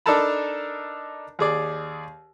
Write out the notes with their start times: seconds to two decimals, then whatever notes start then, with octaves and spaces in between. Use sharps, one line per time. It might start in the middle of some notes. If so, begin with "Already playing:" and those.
0.06 D4 D#4 A4 A#4 A5 B5
1.39 D#2 G#4 D5